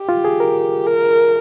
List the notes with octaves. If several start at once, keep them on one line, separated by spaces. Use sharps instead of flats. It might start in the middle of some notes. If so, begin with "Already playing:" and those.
Already playing: G4
F4
G#4
A#4
A#4